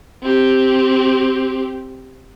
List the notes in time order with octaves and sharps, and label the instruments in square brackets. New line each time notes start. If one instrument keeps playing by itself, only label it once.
[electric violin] C4 G4